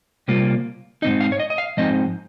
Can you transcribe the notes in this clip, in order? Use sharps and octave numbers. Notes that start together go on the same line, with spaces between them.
C3 G3 A#3 F4
G#2 F3 C4 D#4 D#5
F5
C#5
D#5
D#5
F5
G#2 F3 C4 D#4 D#5